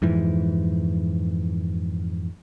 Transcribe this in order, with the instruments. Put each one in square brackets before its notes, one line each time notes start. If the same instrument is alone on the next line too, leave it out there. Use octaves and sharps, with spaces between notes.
[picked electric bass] F2 G#2 E3